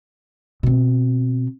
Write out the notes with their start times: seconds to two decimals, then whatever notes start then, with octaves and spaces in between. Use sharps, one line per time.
0.63 B2 C4